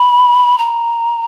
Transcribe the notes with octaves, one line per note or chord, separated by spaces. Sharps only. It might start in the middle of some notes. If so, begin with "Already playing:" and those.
Already playing: B5
A#5